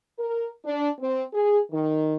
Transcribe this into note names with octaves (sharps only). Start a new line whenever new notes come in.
A#4
D4
C4
G#4
D#3